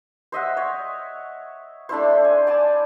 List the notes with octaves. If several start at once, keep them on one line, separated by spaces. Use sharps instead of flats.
C5 D#5 E5 F#5
C#5
A3 D4 E4 C5
G#5
D5 G#5 A5